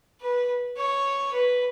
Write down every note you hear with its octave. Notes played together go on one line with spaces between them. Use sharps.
B4
C#5
B4